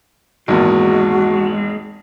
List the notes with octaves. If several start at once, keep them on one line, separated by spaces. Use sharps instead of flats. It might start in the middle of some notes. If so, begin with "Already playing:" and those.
G#1 E2 A#2 G#3 F#4